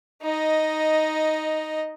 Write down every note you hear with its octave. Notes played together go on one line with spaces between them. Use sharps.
D#4 D#5